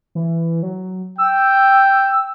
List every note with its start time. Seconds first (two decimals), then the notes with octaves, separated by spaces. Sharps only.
0.15 E3
0.63 F#3
1.18 G5 E6